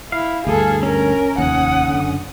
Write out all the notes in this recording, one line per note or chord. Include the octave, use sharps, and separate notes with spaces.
E4 F5
D2 G2 G#4 A4
C#4 A#4
F1 D#2 F#5 D#6
F#1 D3